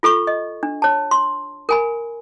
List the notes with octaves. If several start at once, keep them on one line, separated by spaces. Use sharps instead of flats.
F4 A4 B5 C#6
D#5
D4
C#5 A5
C6
A#4 G#5 B5